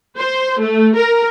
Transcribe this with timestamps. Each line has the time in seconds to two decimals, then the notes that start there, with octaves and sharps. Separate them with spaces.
0.17 C5
0.59 A3
0.95 A#4